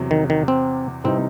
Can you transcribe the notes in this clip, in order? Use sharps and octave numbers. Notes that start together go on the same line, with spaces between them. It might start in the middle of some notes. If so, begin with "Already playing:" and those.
Already playing: E2 C3 F#3
D#3
D#3
C4
C3 E3 G3 C4 D#4